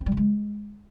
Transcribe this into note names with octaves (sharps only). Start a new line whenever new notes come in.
C4
G3
C#3
G#3